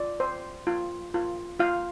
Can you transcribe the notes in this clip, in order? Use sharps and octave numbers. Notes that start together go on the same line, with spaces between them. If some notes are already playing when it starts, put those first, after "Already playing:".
Already playing: F4 D5
C5
F4
F4
F4 F5